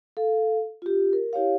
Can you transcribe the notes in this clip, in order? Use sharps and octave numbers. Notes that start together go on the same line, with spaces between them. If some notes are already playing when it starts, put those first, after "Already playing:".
A4 F5
F4 G4
A#4
E4 G4 C#5 F5